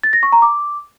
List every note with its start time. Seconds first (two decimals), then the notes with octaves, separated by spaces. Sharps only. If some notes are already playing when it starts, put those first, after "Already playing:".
0.03 A6
0.13 A#6
0.23 C#6
0.32 A#5
0.42 D6